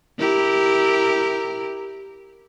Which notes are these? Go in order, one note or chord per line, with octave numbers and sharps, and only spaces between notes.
E4 G4 A#4